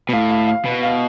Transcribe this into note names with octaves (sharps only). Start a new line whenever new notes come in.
B2
A2 F5
F5
F5
B2
F5